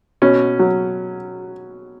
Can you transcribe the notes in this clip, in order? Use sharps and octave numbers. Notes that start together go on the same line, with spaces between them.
B2 C#4
F#3